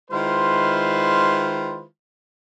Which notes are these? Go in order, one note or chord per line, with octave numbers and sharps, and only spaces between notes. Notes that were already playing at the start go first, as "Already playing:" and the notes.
D#3 G#3 E4 F4 B4 C5